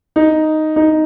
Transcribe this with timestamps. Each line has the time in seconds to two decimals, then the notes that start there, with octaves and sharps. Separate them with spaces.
0.16 D#4
0.76 D#4